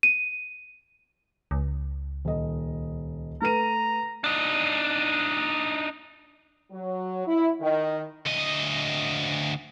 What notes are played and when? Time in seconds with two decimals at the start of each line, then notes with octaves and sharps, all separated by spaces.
0.03 D#7
1.51 C#2
2.25 D#1 D#5
3.42 A3 B4 A#5 D#7
4.24 D4 D#4
6.71 F#3
7.27 E4
7.61 D#3
8.26 D2 D#5